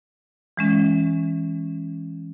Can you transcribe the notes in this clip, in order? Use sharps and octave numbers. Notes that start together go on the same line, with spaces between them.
E3 G#3 C#4